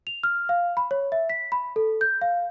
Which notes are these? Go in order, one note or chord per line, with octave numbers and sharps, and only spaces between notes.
F7
F6
F5
B5
C#5
E5
B6
B5
A4
G6
F5